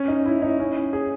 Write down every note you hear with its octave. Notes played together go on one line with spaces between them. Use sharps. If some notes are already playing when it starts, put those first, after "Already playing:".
Already playing: C#4
D#4
E4
D#4
C#4
G#4